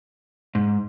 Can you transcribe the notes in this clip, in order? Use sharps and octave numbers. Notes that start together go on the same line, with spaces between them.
G#2